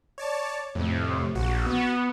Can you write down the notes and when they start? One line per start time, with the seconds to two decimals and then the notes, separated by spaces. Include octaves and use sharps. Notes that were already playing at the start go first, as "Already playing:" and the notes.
0.18 C#5 D5 A5
0.75 F2 A2 C3
1.35 A#1 F#4
1.66 B3